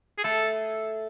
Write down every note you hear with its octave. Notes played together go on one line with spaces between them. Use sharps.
G#4
A3 A4